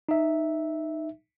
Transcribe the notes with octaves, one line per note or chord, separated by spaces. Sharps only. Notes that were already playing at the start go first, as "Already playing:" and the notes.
D#4 E5